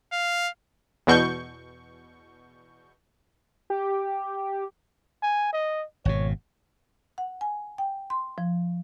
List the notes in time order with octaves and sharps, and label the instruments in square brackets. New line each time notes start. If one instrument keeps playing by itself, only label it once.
[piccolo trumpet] F5
[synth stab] E2 B2 C#6 G6
[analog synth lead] G4
[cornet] G#5
D#5
[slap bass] G#1 B2 [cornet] C#5
[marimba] F#5
G#5
G5
C6
F3